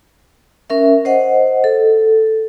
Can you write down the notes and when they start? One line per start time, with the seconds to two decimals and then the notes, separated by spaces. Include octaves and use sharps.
0.70 C#4 A#4 E5
1.05 C5 D#5 F#5
1.64 A4